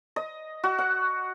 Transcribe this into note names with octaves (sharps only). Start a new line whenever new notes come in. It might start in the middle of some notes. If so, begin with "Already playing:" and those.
D#5
F#4
F#5